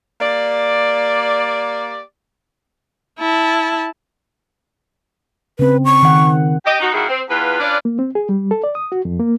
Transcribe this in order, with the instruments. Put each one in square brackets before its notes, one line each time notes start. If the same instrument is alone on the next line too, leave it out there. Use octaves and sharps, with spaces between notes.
[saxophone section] A#3 G4 D5
[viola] E4 A5
[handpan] C#3 C4 [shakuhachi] B4
[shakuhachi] C#6
[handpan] D#3 F#5
[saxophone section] G4 D#5
D#4 F#4
D#3 G3 A#3 E4 F#4 G#4
C4
E2 F4 B4
C#4 D4 F4 B4 D5
[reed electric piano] A#3
C4
G#4
G3
A4
D5
D#6
F#4
F2
A#3